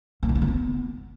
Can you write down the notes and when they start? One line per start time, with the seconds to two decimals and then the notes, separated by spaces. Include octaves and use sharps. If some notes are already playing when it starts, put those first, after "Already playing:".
0.23 A#2
0.29 D#3
0.35 D3
0.42 F3
0.48 B3